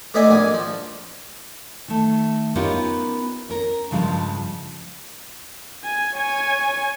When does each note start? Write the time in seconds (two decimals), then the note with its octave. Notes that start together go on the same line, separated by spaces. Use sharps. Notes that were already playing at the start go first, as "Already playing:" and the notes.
0.14 A3 B3 D#4 D5 E5 G#5
0.29 A#1 A#3 G#5
0.54 F3
1.88 D#3 A3
2.55 B3 C#4 D#4 F4 G4 A#4
3.49 C#4 A#4
3.91 G2 C#3 F3 G#3
5.84 G#5
6.16 C#5 G#5